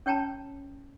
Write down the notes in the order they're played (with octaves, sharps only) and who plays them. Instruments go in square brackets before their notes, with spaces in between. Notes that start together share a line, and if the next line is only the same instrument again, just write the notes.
[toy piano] C#4 C#5 G5 A5 A#5